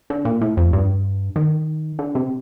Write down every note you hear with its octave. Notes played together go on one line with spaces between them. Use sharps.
D3
A#2
A2
F2
G2
D#3
D3
C3